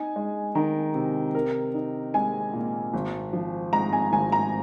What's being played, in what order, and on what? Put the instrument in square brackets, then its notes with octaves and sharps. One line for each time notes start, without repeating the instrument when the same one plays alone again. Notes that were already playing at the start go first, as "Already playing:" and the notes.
Already playing: [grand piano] D#4 [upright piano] G#5
[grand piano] G#3
[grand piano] D#3 [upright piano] A#5
[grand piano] C3
A#4
D#4
[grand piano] G#3 [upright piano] G#5
[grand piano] A#2
G#1
F3
[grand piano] G#2 [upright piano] A#5
[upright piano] G#5
[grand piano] G#1 [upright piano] G#5
[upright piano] A#5